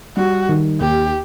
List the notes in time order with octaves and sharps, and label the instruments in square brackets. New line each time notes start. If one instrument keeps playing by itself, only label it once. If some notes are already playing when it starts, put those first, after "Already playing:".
[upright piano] G3 [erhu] F#4
[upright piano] D#3
[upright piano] D#2 [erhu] G4